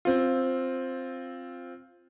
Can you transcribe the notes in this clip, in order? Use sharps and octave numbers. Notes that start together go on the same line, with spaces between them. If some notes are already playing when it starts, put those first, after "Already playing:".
C4 F4